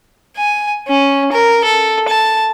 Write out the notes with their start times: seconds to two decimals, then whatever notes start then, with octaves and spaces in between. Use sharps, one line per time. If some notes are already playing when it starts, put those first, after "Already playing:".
0.37 G#5
0.88 C#4
1.32 A#4
1.65 A4
2.09 A5